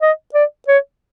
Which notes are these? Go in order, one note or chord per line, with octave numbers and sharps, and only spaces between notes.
D#5
D5
C#5